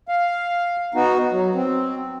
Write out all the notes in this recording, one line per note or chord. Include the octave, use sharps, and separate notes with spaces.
F5
B3 D#4 F#4
F#3
C4